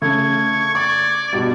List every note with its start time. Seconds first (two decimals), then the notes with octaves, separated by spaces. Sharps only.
0.02 C#3 A3 C#6 G#6
0.75 D5 C#6
1.33 G2 B2